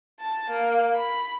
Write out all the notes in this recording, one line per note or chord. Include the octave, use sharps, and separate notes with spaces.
A5
A#3
B5